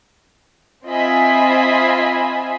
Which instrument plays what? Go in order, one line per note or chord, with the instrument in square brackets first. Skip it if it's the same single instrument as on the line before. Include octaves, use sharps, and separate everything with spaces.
[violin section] C4 F4 D#5 E5 G#5 B5